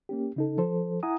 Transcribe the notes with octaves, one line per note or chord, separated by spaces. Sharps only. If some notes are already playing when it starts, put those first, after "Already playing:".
A#3 C#4 G4
C#3 D#4 A4
F3 A4 C5
E4 F#5 G#5 A#5 D#6